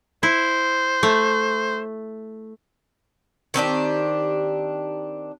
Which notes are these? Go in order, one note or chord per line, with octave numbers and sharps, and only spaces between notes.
E4 C5
A3
D#3 C4 D4 G4